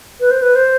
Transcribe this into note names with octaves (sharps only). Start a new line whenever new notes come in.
B4
C5
B4
C5